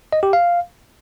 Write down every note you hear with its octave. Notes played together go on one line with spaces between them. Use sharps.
D#5
G4
F5